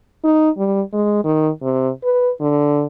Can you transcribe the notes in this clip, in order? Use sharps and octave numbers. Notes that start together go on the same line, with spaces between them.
D#4
G3
G#3
D#3
C3
B4
D3